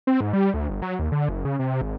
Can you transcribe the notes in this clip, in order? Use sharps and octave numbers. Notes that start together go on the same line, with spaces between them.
C4
G#2
G3
D2
G1
F#3
D#2
D3
F#1
C#3
C3
G#1